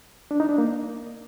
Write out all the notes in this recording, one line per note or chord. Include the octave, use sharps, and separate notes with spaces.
D4
D#4
D4
A#3